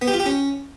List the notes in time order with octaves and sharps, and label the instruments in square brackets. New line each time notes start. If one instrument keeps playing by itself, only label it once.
[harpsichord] B3
G4
F4
G4
C#4